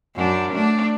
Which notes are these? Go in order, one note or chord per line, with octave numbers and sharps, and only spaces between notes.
F#2 D4
A3 D4